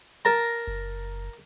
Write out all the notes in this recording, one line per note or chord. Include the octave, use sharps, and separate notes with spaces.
A#4 A5 A#5
F#1